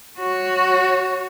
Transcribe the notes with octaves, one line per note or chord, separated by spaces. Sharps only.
F#4 C#5